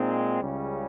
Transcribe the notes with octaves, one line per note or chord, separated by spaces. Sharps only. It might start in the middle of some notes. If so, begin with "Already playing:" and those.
Already playing: A#2 G#3 C4 D#4
C#2 C#3 G3 C#4